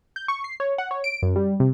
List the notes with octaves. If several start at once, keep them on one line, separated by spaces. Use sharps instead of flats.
G6
C#6
C7
C#5
F#5
C#5
D7
F#2
G3
C3